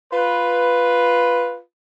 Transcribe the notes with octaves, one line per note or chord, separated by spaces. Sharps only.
F4 B4